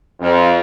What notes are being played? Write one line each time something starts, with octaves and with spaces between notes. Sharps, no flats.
F2